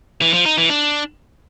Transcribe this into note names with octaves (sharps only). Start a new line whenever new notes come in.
E3
F3
D#4
E3
D4